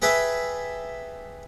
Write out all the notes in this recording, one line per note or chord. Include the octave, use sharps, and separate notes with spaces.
G4 G#4 B4 E5 G#5 A5